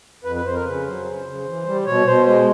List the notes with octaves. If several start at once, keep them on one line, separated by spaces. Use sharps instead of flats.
F2 B4
B4
F2 C5
A#4
C#3 B4
F#3 C5
C#3
C#3
E3
G3
B2 C#5
B2 C5
G#3 C5